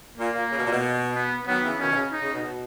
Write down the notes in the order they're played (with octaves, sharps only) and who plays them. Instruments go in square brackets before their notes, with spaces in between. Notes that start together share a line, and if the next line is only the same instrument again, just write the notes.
[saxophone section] A#2 [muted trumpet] A#3
[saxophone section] A#2
C#3
B2
A#2
B2
[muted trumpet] B3
[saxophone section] D#3 F#3 [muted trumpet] B3
[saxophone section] C#3 E3
[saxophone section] B2 D#3 [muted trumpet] C#4
[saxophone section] B2
C#3
[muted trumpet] D#4
[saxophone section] C#3
B2
B2